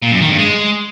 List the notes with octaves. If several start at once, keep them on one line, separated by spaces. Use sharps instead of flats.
A#2
F#2
D#3
G2
G#3